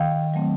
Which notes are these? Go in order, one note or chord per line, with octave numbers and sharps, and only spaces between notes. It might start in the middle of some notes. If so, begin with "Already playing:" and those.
Already playing: D#3 F5 G5
F#3 A3 C4